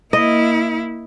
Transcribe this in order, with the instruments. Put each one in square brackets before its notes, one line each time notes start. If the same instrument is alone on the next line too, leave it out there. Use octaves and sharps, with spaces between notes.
[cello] A#3 E4 [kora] D#5